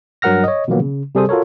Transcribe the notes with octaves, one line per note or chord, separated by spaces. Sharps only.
G2 F#3 A#4 F#5 F6 A#6
C#5 D#5
B2 D#3 F3 F#3 A#3 B3
C#3
C3 G3 G#4 A4 C5 D#6
F4 F#4 A4 A#4 C#5